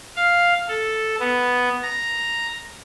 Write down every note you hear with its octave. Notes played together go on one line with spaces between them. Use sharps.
F5
A4
B3
A#5